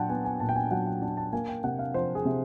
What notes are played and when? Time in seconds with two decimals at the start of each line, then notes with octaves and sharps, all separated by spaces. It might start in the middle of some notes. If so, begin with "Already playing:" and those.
Already playing: A#2 F#3 D4 F#5 G5 A5
0.09 B3 G#5
0.25 G#5
0.40 A#2 A5
0.49 G5
0.56 G#5
0.71 F#3 F#5
0.87 G5
1.02 D4
1.17 A5
1.33 A#3 G#5
1.48 G5
1.64 C3 F#5
1.79 F5
1.94 F3 C5
2.15 G#4
2.25 C3